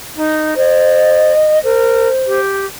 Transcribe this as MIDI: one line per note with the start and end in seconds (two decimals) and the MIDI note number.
0.15 0.54 63
0.56 1.32 72
0.56 1.57 75
1.64 2.08 70
1.64 2.40 72
2.26 2.65 67